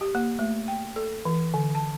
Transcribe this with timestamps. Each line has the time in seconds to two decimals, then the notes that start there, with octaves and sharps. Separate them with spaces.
0.01 G4
0.15 A#3
0.39 A3
0.68 G5
0.96 A4
1.25 E3
1.54 D3
1.75 A5